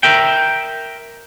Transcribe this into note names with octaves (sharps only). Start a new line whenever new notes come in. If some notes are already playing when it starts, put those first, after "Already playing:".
A#4 E5 G5